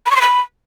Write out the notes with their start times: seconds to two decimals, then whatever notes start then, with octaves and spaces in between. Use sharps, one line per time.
0.06 B5
0.11 C#6
0.16 C6
0.21 B5